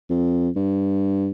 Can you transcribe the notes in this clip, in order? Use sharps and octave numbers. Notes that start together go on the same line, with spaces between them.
F2
G2